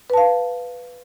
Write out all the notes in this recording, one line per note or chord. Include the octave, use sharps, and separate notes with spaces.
B4 F5 A5